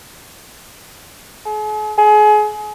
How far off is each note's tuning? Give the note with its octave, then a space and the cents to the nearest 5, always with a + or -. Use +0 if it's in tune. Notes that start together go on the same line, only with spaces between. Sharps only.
G#4 +45
G#4 +30